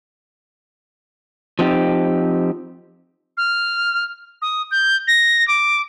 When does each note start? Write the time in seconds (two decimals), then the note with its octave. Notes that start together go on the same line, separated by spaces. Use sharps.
1.59 F3 C4 D#4 G4
3.37 F6
4.42 D#6
4.71 G6
5.08 A#6
5.48 D6